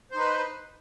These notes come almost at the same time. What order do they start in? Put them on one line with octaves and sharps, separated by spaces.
C5 D#4 B4